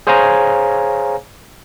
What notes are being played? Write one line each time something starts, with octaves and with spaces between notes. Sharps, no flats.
G#4 C5 C#5 F5 G#5 A#5